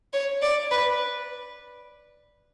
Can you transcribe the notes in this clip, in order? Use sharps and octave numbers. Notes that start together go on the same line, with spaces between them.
C#5
D5
B4